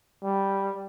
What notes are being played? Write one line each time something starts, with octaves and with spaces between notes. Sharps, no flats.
G3